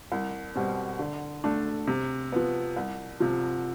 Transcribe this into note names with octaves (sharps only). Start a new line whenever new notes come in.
C2
B2 G3 C4
D3
A3 D4
C3
F3 B3
C2
C3 F3